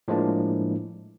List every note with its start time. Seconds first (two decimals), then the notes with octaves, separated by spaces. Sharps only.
0.08 A2 F3 G#3 A#3 D4